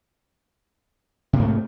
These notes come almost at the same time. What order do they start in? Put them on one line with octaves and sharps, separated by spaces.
C3 A#3 G#2 A3